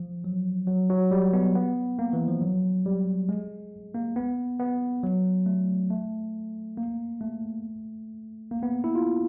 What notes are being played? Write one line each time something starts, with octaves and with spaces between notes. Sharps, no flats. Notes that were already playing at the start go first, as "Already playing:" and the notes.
Already playing: F3
F#3
F#3
F#3
G3
B3
B3
A#3
E3
F3
F#3
G3
G#3
A#3
B3
B3
F#3
A3
A3
A#3
A3
A#3
B3
E4
F4